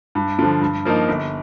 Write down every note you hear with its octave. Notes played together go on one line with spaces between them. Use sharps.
G2
D3 F3
G2
F3 A#3 D#4
G1